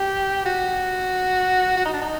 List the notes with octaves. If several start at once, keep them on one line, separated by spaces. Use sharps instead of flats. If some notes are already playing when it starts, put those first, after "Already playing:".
Already playing: G4
F#4
F#4
D#4
D4
D#4